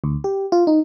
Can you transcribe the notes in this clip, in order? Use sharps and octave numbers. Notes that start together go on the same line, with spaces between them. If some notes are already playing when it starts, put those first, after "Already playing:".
D2
G4
F4
D#4